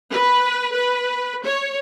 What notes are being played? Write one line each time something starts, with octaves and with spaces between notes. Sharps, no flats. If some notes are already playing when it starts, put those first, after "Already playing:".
B4
B4
C#5